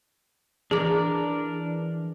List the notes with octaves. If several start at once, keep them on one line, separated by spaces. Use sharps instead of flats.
E3 D4 G#4 A#4 D6